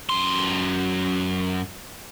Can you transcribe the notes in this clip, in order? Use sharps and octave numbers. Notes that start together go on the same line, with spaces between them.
F#2 C6